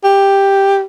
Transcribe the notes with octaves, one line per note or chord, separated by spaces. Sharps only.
G4